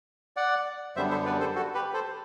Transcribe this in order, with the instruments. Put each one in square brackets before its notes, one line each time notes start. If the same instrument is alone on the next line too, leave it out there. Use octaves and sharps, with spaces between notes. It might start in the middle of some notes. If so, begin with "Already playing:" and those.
[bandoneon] D5 F#5
F#2 D3 G3 B3 C5 E5
A4 C5
B4 D5
A4 C5
F#4 A4
G4 B4
A4 C5